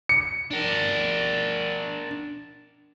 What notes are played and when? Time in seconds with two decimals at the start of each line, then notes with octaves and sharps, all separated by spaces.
0.09 C#7
0.51 D4 A#4